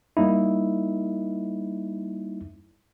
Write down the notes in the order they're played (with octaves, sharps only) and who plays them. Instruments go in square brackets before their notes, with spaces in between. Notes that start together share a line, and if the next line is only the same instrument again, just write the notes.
[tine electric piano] G3 A#3 D#4 E4